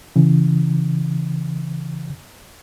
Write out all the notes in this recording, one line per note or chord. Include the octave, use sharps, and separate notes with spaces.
C#3 E3